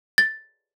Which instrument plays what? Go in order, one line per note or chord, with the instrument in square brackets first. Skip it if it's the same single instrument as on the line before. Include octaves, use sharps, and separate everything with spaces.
[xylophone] A6